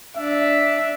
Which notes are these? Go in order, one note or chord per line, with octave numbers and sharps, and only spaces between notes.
D4 E5